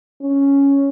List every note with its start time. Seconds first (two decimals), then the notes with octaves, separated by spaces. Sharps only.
0.21 C#4